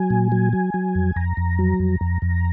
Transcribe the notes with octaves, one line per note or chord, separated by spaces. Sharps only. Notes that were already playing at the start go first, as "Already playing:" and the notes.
Already playing: F#3 G#5
A#2
F#3
F#3
F#3
F2
F2 A#5
F2
F#3
F2
F2
F2